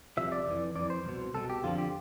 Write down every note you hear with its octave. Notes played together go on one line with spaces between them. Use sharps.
C2 C3 F3 E5
D5
F2 E3
F2 E3 D5
C5
C2 B2
C2 B2 A4
G4
F2 D3 F3 F4
G4